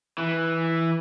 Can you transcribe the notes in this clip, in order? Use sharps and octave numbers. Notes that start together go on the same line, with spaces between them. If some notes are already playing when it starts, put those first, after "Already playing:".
E3